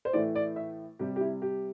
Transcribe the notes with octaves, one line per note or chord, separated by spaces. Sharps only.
C5
A2 E3 A3 D5
D5
E5
C3 G3 G4
G4
E4
G4